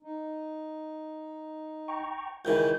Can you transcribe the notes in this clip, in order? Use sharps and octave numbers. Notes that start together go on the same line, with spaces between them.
D#4
G5 A#5 C#6
C#2 D#3 E3 G6